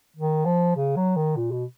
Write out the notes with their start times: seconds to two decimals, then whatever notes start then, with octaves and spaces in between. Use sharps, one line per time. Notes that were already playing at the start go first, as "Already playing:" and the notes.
0.16 D#3
0.45 F3
0.76 C#3
0.96 F#3
1.16 D#3
1.36 A#2
1.51 B2